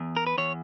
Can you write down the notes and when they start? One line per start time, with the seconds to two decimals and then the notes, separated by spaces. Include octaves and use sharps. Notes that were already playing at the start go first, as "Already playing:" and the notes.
Already playing: E2
0.17 A#4
0.27 B4
0.38 E2 C#5